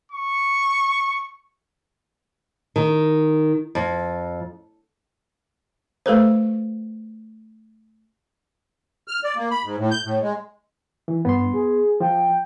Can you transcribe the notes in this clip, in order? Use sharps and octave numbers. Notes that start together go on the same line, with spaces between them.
C#6
D#3
F2
A3 A4 B4 C5
F6
D5
A#3
B5
G#2
A2
G6
A2
G#3
E3
G2 B3 C6
G#4
F3 G5